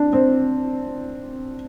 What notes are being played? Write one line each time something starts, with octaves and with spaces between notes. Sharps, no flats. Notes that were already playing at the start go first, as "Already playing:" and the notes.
Already playing: D4
C4